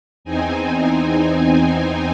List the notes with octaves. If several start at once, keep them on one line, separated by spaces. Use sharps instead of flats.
E2 C4 D#4 G#5